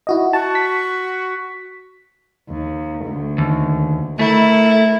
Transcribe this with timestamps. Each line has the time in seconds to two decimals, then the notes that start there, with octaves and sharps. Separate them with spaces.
0.07 E4 F#4 D#5
0.33 F#4 A5
0.55 B6
2.49 D#2
3.06 D2
3.38 D#2
4.19 A3 E4 A#4